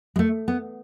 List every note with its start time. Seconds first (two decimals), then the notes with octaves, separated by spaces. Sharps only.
0.16 G#3
0.19 A3
0.48 B3